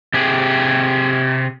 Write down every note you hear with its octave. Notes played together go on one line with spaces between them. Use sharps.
C3 G4 G#4